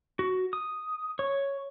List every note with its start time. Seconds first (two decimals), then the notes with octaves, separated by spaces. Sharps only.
0.19 F#4
0.53 D#6
1.19 C#5